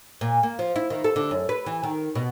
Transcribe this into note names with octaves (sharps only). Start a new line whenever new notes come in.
A#2
A#3
F3
E4
D#3
A4
D3
F#2
B4
E3
D#3
B2